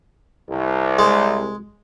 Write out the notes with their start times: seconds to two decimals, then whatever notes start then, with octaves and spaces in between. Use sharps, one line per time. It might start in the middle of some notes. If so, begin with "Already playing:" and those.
0.49 C2
0.99 G#3